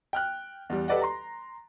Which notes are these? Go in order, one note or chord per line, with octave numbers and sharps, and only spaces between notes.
G5 F6 F#6
E2 G3
G4 A4 B4 D5 D#5 F#5
A#5 C6